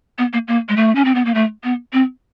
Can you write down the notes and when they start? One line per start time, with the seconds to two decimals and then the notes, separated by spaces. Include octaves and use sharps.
0.18 B3
0.33 A#3
0.48 A#3
0.69 G#3
0.76 A3
0.95 C#4
1.05 C4
1.15 B3
1.25 A#3
1.34 A3
1.64 B3
1.93 C4